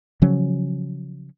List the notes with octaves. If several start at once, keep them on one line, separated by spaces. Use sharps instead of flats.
C#3 F3 F#3 C#4